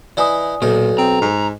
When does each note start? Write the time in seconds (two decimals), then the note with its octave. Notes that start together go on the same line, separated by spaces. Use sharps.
0.17 E3 D#4 E4 D5 G#5 D#6
0.62 B1 A#2 D#4
0.98 C4 A#5
1.22 G#2